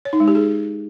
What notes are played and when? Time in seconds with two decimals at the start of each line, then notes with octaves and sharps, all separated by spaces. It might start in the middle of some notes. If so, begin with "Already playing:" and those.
0.05 C#5
0.13 D#4
0.20 G#3
0.28 G4
0.35 G#4